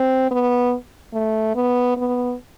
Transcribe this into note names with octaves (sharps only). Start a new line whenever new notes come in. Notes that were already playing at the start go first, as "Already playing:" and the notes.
Already playing: C4
B3
A3
B3
B3